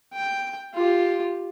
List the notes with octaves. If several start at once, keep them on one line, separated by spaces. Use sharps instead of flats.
G5
F4 G4